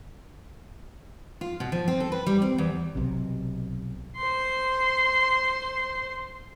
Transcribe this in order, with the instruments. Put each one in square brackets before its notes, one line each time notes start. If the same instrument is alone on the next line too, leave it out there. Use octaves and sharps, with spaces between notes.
[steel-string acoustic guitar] F4
B2
F3
C4
A4
B4
G3
C4
E2
[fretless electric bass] B1 C3
[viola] C5 C6